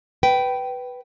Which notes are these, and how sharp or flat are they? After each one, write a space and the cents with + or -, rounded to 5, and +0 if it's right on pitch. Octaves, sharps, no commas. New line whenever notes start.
B4 +0 G5 -15